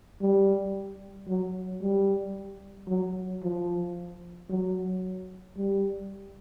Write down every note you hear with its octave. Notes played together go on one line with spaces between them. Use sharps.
G3
F#3
G3
F#3
F3
F#3
G3